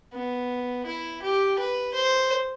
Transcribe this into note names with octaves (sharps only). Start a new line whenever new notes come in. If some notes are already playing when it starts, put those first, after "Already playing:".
B3
E4
G4
B4
C5